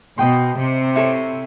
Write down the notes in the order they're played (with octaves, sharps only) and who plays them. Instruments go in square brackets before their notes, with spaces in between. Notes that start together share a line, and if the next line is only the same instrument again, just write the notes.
[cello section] B2 [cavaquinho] C5 D#5 G5 C6
[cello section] C3
[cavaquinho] E4 A4 C#5